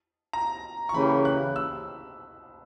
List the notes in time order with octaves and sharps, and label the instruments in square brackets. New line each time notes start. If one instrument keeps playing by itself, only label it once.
[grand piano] A#5
C#6
[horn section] C#3 E3 A#3 C#4 G4 [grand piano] B5
[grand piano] F#6
E6